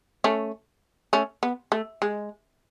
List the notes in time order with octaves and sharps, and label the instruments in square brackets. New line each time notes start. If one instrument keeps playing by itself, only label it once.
[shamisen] A3 C#4
A3 C#4
B3
A3
G#3